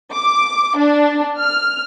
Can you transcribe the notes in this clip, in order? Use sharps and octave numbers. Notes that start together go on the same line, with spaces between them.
D6
D4
F6